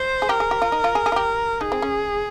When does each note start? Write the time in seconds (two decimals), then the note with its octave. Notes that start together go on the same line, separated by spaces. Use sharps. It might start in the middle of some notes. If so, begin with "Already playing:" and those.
Already playing: C5
0.22 G#4
0.29 G4 A#4
0.40 G#4
0.51 G4
0.62 F4
0.72 D#4
0.84 F4
0.95 G#4
1.06 G#4
1.12 F4
1.16 G4
1.61 D#4 G#4
1.72 C4
1.82 C#4